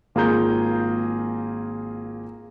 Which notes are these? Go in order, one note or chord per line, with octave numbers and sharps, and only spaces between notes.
G#1 A#3 F4 G#4 A#5 G6